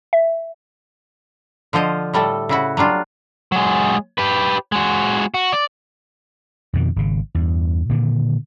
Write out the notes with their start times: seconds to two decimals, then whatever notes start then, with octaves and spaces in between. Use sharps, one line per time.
0.13 E5
1.73 D3 F3 F4 C5 D#5
2.14 A2 G3 A3 A4
2.49 C#3 E4 F#4
2.77 F#3 G3 D4 F4
3.52 F#3 G#3
4.18 G4 B4
4.72 G#3 F#4
5.34 F#4
5.53 D5
6.73 F2 B2 D#3
6.96 G#1 C#3
7.35 E2 G2
7.89 A#2 D3 D#3